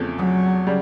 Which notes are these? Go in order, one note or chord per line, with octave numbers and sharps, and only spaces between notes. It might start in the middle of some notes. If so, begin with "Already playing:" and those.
Already playing: E2 C#3 F3 A3 C4
F#3
C#3 G3